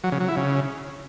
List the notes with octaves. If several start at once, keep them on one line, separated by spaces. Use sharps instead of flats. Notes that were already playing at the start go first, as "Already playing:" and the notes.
F#3
C#3
F#3
E4
C#3